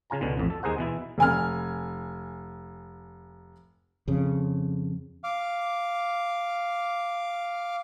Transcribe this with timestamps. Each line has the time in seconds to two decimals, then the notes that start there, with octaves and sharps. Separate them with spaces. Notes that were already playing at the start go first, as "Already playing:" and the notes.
0.10 C#3 F4 G#5 A#5
0.21 C#2 B2 D3
0.37 A1 F2
0.50 A4
0.63 D#2 G#3 G#4 A#4 C5 F#5
0.78 B2 E3 E4
1.18 F1 G#5 F6
4.08 F2 C#3
5.24 F5 D6